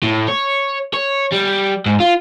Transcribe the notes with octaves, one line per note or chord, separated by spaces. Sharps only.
A2
C#5
C#5
G3
G#2
F4